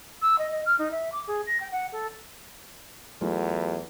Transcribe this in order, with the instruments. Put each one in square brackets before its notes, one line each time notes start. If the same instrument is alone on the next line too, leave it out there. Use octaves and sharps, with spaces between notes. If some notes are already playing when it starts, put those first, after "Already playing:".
[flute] E6
D#5
D#5
F6
D#4
E5
D6
G#4
A#6
G5
F#5
A4
[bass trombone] E2 [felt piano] F#3 A3 F4